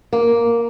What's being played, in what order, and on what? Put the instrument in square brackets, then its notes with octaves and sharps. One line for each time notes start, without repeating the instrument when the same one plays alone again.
[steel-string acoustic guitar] A#3